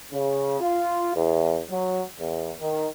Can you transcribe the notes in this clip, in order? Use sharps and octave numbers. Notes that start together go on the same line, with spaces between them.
C#3
F4
E2
F#3
E2
D#3